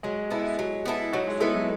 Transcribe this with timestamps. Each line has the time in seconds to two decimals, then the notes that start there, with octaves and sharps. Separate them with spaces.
0.03 F#3 G#3
0.31 B3 E4 A4
0.59 F#3
0.86 B3 E4 A4
1.13 F#3 D#4 F#4
1.27 G#3
1.40 G#3 B3 E4 A4
1.54 F#3